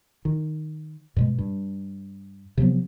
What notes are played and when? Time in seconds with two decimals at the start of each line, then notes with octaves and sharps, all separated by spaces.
0.25 D#3
1.16 G2 B2 G#3
1.38 G2
2.57 C3 F3 F#3 B3